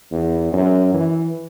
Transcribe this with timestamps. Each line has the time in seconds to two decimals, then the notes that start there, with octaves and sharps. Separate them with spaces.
0.12 E2
0.53 F#2
0.94 E3